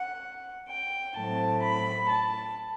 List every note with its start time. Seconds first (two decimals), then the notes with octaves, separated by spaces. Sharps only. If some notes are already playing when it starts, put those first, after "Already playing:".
Already playing: F#5
0.68 G5
1.16 A2 F#3 A3 C4 A5
1.63 B5
2.10 A5